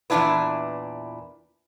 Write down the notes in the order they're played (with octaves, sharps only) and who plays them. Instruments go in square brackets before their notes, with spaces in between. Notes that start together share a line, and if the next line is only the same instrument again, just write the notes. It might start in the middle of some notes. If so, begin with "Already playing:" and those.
[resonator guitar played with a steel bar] E2 A#2 C#3 D4 E4 B4